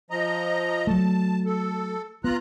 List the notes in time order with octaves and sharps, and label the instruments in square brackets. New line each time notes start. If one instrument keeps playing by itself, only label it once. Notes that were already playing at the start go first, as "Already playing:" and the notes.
[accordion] F3 D#5 A#5
[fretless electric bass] F#3 A3 [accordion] A5
[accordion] A4
[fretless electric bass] B3 [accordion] F4 A#5 F#6